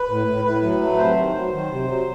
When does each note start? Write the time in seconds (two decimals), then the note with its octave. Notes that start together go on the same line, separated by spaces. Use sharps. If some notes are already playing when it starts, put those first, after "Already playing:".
Already playing: B4
0.08 A2
0.27 A2
0.44 A2 B4
0.63 F#3
0.81 A3
0.98 C3 C5
1.16 D#3
1.34 F#3
1.52 D#3
1.70 C3
1.87 F#3